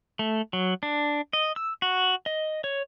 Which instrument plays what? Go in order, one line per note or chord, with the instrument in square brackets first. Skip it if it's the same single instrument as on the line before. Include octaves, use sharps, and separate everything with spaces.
[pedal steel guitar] A3
F#3
D4
D#5
E6
F#4
D#5
C#5